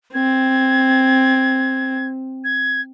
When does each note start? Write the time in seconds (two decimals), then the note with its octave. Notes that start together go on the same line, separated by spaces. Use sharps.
0.14 C4 G#6
2.44 G#6